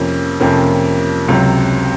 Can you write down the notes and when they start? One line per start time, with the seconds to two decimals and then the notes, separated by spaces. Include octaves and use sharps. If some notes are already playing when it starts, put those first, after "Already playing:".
Already playing: F2 C3 F3 A#3 C#4
0.40 F2 C3 F3 A#3 C#4
1.28 C#2 C3 F#3